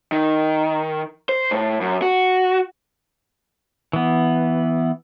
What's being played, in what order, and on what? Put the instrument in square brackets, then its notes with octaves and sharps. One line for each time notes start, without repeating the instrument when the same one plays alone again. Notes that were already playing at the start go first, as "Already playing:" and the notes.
[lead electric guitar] D#3
C5
A2
F#2
F#4
[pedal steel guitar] E3 B3